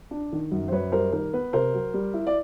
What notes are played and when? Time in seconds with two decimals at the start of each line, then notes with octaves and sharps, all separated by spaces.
0.11 D4
0.32 D#3
0.51 F#2
0.68 C5
0.72 F#2 B4 C#5
0.92 G3 A#4 C5
1.12 D#3 A#4
1.33 B3 B4
1.53 C3 A#4 C5
1.73 F#3
1.94 G3
2.14 E4
2.27 D5